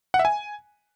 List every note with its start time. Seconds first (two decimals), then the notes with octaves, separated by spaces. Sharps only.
0.14 F#5
0.19 E5
0.25 G#5